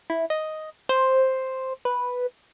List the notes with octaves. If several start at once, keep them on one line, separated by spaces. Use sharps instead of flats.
E4
D#5
C5
B4